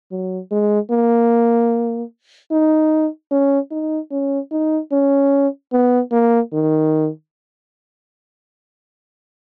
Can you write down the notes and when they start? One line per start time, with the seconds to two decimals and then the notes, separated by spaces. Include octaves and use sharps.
0.11 F#3
0.51 G#3
0.91 A#3
2.51 D#4
3.31 C#4
3.71 D#4
4.11 C#4
4.51 D#4
4.92 C#4
5.72 B3
6.12 A#3
6.53 D#3